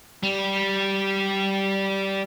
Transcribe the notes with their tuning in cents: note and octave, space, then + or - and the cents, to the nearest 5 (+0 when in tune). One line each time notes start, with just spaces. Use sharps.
G3 -10